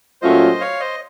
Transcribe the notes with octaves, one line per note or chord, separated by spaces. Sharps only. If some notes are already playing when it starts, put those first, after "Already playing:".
A#2 F#3 A3 C#4 F4 C5 D#5
C#5 F5
C5 D#5